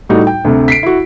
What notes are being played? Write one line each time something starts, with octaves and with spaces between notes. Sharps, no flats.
A2 G3 D#4 F#4
G5
D2 C3
B6 C7 D7
E4 F#4